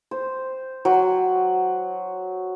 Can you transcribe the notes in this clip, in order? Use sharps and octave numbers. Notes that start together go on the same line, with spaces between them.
C5
F#3